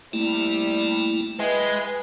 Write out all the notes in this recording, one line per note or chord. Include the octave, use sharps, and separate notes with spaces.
C3 G3 A3 A#3 E4
G#3 B4 E5 G5